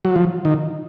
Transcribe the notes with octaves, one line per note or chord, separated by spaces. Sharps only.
F#3
F3
D#3